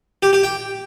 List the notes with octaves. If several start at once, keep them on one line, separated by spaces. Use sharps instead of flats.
G4
G4
G5